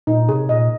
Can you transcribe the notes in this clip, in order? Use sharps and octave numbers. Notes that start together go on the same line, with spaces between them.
A#2 D#4
C3 G#4
A#2 D#5